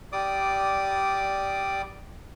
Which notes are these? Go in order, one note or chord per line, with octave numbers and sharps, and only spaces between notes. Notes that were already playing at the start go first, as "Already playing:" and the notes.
G3 D5 D6 D#6